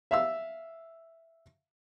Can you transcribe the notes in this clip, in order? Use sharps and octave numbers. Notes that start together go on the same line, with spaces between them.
E5 F5 E6